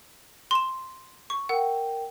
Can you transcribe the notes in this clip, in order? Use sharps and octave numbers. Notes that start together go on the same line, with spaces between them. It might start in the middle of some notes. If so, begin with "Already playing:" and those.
C6 E7
C#6
A#4 F#5 G5